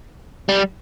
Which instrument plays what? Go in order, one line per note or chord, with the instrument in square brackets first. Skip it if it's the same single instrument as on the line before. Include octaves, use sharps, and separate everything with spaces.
[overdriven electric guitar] G3